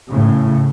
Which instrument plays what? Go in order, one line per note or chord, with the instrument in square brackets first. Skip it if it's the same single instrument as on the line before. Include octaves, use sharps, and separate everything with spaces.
[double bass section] A2 C#3